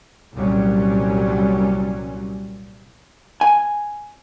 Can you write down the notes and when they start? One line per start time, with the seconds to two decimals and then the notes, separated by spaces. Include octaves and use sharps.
0.34 C2 A#2 F#3 G3 C#4
3.41 G#5